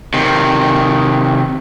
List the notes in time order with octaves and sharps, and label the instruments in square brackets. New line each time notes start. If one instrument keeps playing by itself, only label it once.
[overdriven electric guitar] C3 D#3